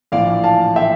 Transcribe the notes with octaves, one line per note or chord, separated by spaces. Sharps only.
A#1 A2 E3 D5 F5
F5 A5
A2 E3 E5 G5